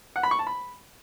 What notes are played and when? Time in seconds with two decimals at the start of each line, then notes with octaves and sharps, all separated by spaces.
0.16 F#5
0.23 B5
0.31 C#6
0.39 A5
0.47 B5